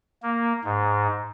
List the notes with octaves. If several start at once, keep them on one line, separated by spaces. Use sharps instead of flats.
A#3
G#2